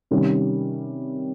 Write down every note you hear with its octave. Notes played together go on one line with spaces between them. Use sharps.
C3 D#3 G3 C#4